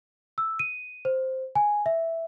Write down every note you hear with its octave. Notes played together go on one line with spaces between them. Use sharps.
E6
D#7
C5
G#5
E5